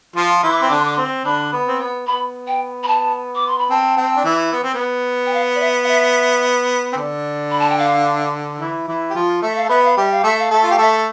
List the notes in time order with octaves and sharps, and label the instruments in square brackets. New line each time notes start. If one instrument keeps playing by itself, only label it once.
[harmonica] F3 F4
[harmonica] E3 E4 [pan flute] C6
[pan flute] D6
[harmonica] C4 [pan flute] C6
[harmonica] D3 D4 [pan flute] D6
[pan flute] C6
D6
[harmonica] C4 [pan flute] C6
[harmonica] D3 D4 [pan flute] B5
[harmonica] B3
C4
B3
[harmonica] B3 [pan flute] B5
[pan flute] G5
B5
A5
D6
C6
B5
[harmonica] C4 [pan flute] A5
[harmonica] C4
D4
E3 E4
B3
C4
B3
[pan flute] G5
F5
D5
E5
F5
E5
[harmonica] C4
D3 D4
[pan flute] B5
A5
G5
F5
[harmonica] E3 E4
E3 E4
G4
F3 F4
[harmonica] A3 A4 [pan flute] E5
[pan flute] F5
[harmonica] A4
[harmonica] B3 B4 [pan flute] E5
[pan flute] F5
[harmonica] G3 G4 [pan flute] E5
[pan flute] F5
[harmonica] A3 A4 [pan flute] E5
[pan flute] F5
[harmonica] A3 A4 [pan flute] E5
[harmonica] F4
[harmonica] G4 [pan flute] F5
[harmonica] A3 A4 [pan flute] E5